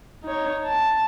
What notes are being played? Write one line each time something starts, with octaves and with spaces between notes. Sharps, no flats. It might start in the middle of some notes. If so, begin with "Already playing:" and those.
D#4 C#5
A5